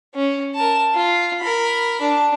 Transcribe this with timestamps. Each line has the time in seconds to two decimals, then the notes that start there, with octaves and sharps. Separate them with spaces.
0.14 C#4
0.55 A#4 A5
0.94 F4
1.41 A#4 B5
2.01 D4